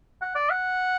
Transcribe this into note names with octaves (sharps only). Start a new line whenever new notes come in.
F#5
D5
F#5